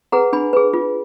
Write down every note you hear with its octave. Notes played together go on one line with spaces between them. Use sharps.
G#4 B4 F#5 A#5
D4 G#5 B5
G#4 B4
F4